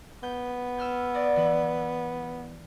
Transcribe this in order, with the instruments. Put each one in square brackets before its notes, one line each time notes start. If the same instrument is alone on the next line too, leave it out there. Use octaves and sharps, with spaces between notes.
[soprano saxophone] B3 [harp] G6
[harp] E6 F6 G6
D5 D#5
E3 E4 B4